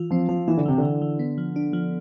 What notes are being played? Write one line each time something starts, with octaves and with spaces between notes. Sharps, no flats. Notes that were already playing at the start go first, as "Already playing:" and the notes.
Already playing: E3 F4
F3 C4
F3 F4
E3 E4
D3
C3 E3
D3 E3
E3
B3
F3
D4
F3